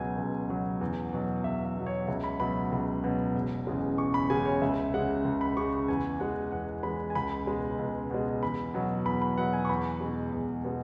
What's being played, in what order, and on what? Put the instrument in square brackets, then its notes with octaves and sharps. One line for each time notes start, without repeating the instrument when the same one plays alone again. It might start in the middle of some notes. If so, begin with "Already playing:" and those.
Already playing: [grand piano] C#2 B2 F#3 G#5
C#2
B2 F#3
E2
B2 F#3
E2 E5
E5
B2 F#3
C#5
C#2 E5
B5
B2 F#3 B5
C#2
B2 F#3
E1
E2 C#3 G#3
E1 C#6
B5
E2 C#3 G#3 G#5
C#5
C#2 E5
C#3 G#3 F#5
C#2
B5
C#3 G#3 C#6
E2 G#5
E3 G#3 F#5
E2 F#5
E3 G#3 B5
G#5
C#2 B5
B2 G#3
C#2
B2 G#3
E2 B5
B2 F#3
E2 B5
B5
B2 F#3 F#5
G#5
C#6
E2 B5
B2 G#3
E2
B2 G#3